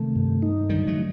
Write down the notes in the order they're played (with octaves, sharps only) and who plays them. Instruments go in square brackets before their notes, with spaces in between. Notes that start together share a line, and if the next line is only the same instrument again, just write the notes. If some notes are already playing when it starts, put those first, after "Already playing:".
Already playing: [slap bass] C3 D#3 [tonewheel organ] A3
[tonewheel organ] G2
D#4
[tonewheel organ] D3 [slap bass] D#3 G3
[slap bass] F#3 A3
[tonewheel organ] D3